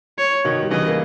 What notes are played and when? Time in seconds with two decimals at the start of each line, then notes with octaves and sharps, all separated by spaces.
0.18 C#5
0.44 B2 D#3
0.63 G3
0.71 C#3 E3 D#5
0.88 A#3